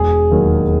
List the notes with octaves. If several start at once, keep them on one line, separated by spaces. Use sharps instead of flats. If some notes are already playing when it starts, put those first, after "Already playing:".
Already playing: E1 G#4
D#2 D#3 F#3